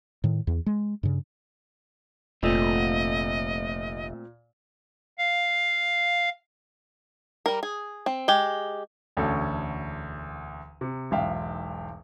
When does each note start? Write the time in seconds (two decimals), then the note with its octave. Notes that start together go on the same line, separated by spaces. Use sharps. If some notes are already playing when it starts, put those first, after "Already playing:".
0.24 A2 D#3
0.47 E2
0.66 G#3
1.03 G2 C#3
2.43 F1 A#2 A3 C4 D#5
5.18 F5
7.46 G3 A#4
7.63 G#4
8.06 C4
8.28 G#3 G4
9.17 E1 D2 D3 C#4 A4 C#6
10.81 C3
11.11 E1 B1 G#2 E5 F5 G5